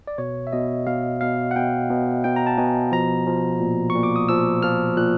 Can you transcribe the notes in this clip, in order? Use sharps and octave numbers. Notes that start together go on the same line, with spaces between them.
D5
B2 C#5
E5
B2 D#5
B2 F5
B2 F5
F#5
B2 G5
B2
B2 G5
A#5
A5
B2 G#5
F3 A#5
F3
A#2
C#6
A#2
D6
D#6
F3 E6
F3 F6
A#2 F#6